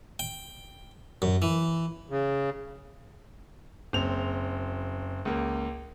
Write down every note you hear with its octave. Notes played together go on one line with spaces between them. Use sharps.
G5
F#2
E3
C#3
F#1 C4 F7
C#2 A#3